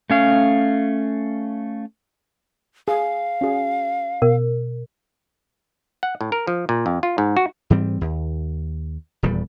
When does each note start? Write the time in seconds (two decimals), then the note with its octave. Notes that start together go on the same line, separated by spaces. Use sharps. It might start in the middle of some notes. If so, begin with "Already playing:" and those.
0.10 A3 C#4 F5
2.88 G#4 F5
3.41 C#4 F#4 G#4
4.22 B2 A#4
6.03 F#5
6.21 A2
6.32 A#4
6.47 F3
6.69 A#2
6.86 F2
7.03 F4
7.18 G#2
7.37 F#4
7.70 G#2 E3 G3 C4
8.01 D#2
9.23 D#1 E2 A#2 G3